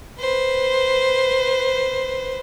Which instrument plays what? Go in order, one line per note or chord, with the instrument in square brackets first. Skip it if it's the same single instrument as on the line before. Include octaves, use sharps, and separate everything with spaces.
[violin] B4 C5